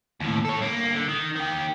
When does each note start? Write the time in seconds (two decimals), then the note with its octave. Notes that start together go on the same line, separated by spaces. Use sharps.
0.20 D#2 A2
0.45 A4 C#5
0.59 G2 A#3
0.95 D3
1.09 D#3
1.36 D#3 G4